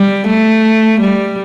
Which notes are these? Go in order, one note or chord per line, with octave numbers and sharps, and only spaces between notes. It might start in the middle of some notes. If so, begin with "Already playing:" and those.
Already playing: G3
A3
G3